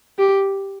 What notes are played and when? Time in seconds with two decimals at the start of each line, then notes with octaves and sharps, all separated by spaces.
0.18 G4